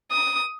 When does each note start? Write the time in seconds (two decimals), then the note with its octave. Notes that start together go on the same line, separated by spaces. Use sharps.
0.12 D#6